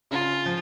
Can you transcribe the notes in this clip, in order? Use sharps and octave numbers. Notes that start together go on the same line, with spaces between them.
C#3 F4
F3